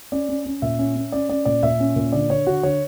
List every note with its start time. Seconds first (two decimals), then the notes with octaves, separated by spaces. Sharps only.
0.12 C#4 D5
0.29 C#4
0.46 C#4
0.62 A#2 E5
0.79 C#4
0.96 C#4
1.12 C#4 D5
1.29 C#4 D5
1.45 A#2 D5
1.63 A#2 E5
1.80 C#4
1.96 A#2
2.12 D3 D5
2.30 D3 C#5
2.47 D3 F#4
2.63 D3 C#5